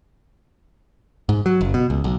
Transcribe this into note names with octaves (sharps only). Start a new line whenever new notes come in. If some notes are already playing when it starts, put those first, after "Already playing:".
G#2
F#3
F#1
B2
C#2
B1